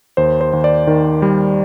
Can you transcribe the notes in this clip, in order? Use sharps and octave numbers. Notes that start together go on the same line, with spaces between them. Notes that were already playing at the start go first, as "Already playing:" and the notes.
D#2 C5
C5
D#2
D5
D#3
G3